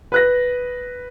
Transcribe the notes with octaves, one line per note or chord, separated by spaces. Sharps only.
B4 F#6 A#6